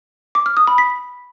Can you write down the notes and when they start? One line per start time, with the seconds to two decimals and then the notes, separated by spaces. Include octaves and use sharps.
0.35 D6
0.46 F6
0.57 D#6
0.67 B5
0.78 B6